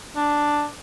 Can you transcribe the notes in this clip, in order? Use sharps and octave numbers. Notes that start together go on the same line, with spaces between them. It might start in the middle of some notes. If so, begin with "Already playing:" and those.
D4